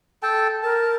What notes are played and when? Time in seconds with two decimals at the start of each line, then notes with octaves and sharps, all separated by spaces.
0.23 A4 G5 A5
0.63 A#4 A5